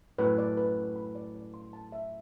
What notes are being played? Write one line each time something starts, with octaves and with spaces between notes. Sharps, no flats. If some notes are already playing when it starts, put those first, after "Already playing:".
F#2 A2 B4
D5
B4
D5
B5
D5
D5
C6
A5
E5